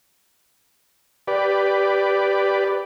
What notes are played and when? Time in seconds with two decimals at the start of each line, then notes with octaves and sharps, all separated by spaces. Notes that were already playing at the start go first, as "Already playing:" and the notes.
1.28 G4 B4 D5